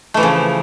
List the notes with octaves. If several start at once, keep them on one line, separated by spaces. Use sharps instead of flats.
C#3 E3 F3 A3